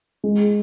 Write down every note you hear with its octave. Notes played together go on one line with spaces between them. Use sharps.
G#3